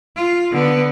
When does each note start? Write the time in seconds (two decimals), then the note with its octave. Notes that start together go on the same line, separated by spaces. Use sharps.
0.16 F4
0.51 D3 B3